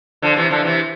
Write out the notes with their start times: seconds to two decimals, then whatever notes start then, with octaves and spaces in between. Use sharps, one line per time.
0.22 D3 F3
0.36 C3 E3
0.50 D3 F3
0.65 C3 E3